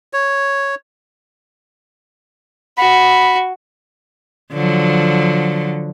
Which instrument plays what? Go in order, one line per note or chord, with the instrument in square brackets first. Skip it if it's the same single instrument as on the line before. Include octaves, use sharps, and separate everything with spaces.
[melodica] C#5
[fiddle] F#4 [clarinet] B5
[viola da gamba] D3 F3 F#3